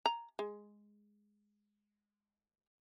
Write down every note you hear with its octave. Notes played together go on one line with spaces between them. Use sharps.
A#5
G#3